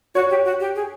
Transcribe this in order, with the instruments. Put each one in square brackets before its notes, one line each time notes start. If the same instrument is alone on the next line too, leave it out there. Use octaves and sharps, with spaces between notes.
[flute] F#4 [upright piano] C#5
[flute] G4
F#4
G4
G#4